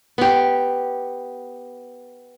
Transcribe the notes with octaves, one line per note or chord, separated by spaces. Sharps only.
B3 G4